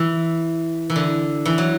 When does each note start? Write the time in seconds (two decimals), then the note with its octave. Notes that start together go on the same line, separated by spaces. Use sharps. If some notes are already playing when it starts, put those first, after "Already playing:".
Already playing: E3
0.90 E3
0.96 D3
1.45 E3
1.58 F#3